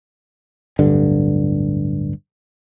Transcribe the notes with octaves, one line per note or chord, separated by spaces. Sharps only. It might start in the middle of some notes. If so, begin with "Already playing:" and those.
D1 G1 G2 D3